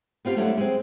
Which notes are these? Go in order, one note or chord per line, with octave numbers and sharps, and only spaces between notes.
B3 C4 F4 G4
F#3 A3 A#3 C#4 D4 E4
G#3 C4